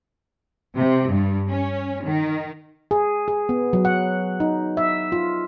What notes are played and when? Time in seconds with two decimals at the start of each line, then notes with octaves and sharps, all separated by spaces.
0.76 C3
1.10 G2
1.49 C#4
2.05 D#3
2.91 G#4
3.28 G#4
3.49 B3
3.73 F#3
3.85 F#5
4.40 D#4
4.77 E5
5.12 F4